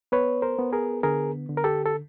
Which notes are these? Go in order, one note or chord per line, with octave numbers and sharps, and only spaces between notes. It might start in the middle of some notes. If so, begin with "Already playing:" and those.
B3 B4 C#5
A#4 C5
B3
G#4 A#4
D3 G#4 A#4
D3
A#4
G4 A4
A4